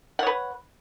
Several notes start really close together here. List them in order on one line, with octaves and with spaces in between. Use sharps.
F#5 C#5 B4